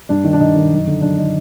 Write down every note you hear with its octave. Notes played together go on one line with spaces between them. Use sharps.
G2 D4
D#3
D4
G2 D#4
D#3
F#2
D3
F#2 D4
D3 D#4